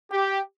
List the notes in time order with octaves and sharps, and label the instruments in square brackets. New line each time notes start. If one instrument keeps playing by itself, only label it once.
[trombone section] G4